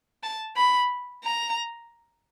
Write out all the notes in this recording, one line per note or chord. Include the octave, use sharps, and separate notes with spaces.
A5
B5
A#5